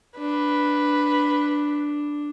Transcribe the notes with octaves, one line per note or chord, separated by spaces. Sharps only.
D4 B4